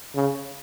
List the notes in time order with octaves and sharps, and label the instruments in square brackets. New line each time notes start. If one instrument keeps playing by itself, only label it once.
[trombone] C#3